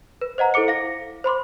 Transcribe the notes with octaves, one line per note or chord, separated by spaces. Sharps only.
B4
C5 D#5 F#5 A#5
E4 A4 C5 D6 C#7
F5 A#6
C5 B5 C6 D6